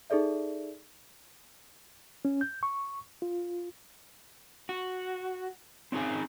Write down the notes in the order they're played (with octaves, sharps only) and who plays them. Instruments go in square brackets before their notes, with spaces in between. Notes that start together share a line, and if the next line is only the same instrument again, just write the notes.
[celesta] D#4 G#4 A4 D5 E5
[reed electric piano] C#4
G6
C#6
F4
[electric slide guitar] F#4
C4 C#4 D#4 G#4 G#5